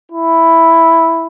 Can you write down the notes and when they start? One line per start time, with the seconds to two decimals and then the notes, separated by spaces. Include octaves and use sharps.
0.10 E4